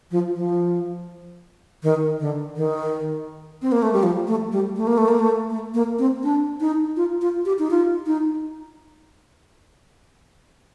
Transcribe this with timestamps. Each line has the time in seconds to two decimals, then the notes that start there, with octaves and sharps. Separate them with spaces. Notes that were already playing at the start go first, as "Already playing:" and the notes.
0.11 F3
0.35 F3
1.83 D#3
2.20 D3
2.56 D#3
3.62 C4
3.72 A#3
3.83 A3
3.93 G3
4.03 F3
4.27 A3
4.52 G3
4.77 A3
4.87 A#3
4.98 A3
5.08 A#3
5.19 A3
5.50 A3
5.74 A#3
5.99 C4
6.23 D4
6.60 D#4
6.97 F4
7.21 F4
7.45 G4
7.59 D#4
7.71 F4
8.07 D#4